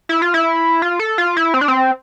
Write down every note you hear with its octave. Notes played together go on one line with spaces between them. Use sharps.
E4
F4
E4
F4
A4
F4
E4
C4
D4
C4